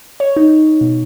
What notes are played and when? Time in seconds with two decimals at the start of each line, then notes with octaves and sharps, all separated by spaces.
0.20 C#5
0.37 D#4
0.81 B2